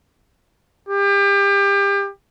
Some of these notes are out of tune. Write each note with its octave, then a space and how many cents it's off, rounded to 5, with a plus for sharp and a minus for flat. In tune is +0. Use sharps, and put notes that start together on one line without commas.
G4 +30